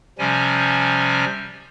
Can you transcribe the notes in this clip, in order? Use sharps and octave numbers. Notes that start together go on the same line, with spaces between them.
C3 F3 G3 C#4 G#5